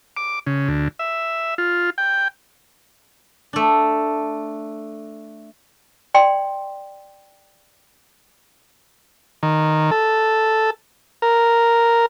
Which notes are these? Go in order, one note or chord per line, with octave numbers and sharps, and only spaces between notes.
D6
C#3
D2
E5
F4
G5
A3 D4
D5 G5 C6
D#3
A4
A#4